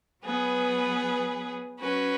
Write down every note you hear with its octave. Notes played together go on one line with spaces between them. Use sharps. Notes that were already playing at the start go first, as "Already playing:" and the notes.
F#3 B3 G#4 B4
F#3 C#4 F#4 B4